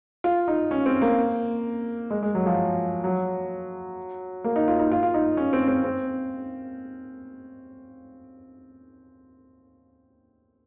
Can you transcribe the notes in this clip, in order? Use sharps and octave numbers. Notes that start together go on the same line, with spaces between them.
F4
D#4
C#4
C4
A#3
G#3
G#3
F#3
F3
F#3
A#3
D#4
F4
D#4
F4
F4
D#4
C#4
C4
C4
C4